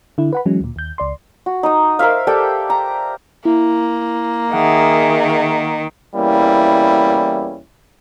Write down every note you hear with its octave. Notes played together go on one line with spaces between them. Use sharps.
D3 E4
B4 F#5 B5
E3 F#3 G#3 C#4
D2 A#2
D#2 G6
C#2 D5 C6
F#4
D#4 D#6
A#4 C5 E5 F5
G4 A4 D5 G5
A#5
A#3 E4
D#3 G#4 E5 F#5
E2 G3 A#3 C#4 E4